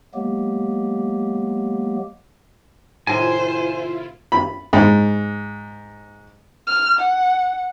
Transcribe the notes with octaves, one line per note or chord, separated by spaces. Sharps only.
F#3 G#3 A#3 B3 G4
A2 C3 D#3 E4 F4 C5 G#5
B5
G#2
F6
F#5